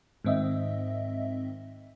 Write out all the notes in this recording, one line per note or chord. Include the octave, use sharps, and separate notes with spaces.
G#2 D#3 C4 D#5 E5